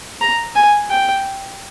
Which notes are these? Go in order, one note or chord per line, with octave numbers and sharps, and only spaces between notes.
A#5
G#5
G5